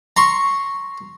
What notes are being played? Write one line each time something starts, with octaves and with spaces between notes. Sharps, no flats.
A#5 C6 C#6